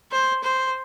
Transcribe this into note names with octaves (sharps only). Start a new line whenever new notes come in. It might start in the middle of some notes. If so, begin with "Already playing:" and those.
C5
C5